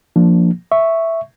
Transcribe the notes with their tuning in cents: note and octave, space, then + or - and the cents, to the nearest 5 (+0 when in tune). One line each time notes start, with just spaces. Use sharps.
F3 +0 A#3 +0 D4 +0
E5 +0 C#6 +0